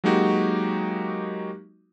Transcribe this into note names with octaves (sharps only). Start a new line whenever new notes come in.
F#3 G#3 A#3 D#4 F#4 G4